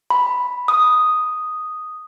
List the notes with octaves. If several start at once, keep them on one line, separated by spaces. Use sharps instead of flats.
B5
D#6